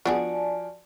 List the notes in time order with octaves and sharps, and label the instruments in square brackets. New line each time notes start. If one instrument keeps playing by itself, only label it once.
[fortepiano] F3 F#4 [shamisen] B3 D4 G#4 [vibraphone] D5 G#5 A5